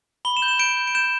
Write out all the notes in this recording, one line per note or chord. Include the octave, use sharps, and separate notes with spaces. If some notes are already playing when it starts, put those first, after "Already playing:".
B5 G7
E7
G6
E7
G6 D7
G6
D7
G6 E7